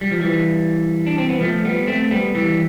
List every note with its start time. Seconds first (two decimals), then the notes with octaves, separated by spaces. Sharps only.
0.01 G3
0.11 F3
0.21 E3 G3
1.06 D4
1.18 C4
1.29 B3
1.41 F3 A3
1.65 G3 B3
1.87 A3 C4
2.11 G3 B3
2.34 E3 G3